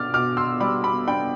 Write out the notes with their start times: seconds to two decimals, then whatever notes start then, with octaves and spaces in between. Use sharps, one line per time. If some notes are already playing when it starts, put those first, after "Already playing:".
Already playing: B2 D4 D6 F6 A6
0.14 B2 D6 F6
0.37 C6 E6
0.60 G3 B5 D6
0.84 B5 D6
1.07 D4 G5 B5